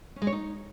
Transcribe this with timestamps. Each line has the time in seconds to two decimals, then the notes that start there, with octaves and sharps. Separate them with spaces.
0.16 C#4
0.22 G#3
0.27 C#5
0.32 D#4